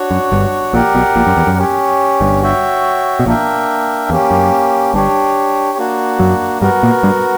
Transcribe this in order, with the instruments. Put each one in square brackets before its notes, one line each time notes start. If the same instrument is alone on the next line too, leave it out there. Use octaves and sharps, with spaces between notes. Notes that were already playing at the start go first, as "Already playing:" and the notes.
Already playing: [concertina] D4 F#4 C#5
[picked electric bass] F#2
G1 G2
[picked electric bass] A#1 A#2 [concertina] G4 A#4 D5 F#5
[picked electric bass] B1 B2
A#1 A#2
F#2
E2
F#2
[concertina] C#4 G4 C#5
[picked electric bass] G1 G2
[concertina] F#4 C#5 E5 G5
[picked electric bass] B2
[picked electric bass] A#1 A#2 [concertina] A#3 D4 A#4 E5 G5
[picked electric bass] E2 [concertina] A#3 C#4 G4
[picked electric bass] F#2
[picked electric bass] G1 G2 [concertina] D4 G4 C#5
[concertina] A#3 D4 F#4
[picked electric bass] F#2 F#3
[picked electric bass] G2 G3 [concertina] B3 F#4 A#4
[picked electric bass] A#2 A#3
G2 G3